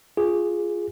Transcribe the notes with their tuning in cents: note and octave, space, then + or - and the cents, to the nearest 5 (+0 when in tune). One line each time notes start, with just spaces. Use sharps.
F4 +0 G#4 +0